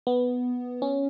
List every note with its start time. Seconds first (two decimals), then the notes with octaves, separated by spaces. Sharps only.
0.07 B3
0.82 C#4